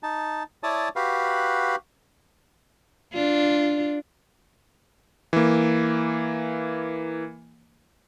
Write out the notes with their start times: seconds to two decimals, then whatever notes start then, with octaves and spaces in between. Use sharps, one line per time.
0.03 D#4 A5
0.63 E4 C#5 D5 A5 D#6
0.96 F#4 G4 B4 F5
3.14 D4 F4
5.33 E3 A#3